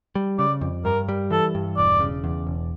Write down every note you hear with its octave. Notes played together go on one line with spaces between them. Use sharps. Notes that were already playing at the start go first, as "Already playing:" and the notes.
G3
C#3 D5
F2
G2 A#4
G3
E3 A4
G2
E1 D5
C#3
E2
E1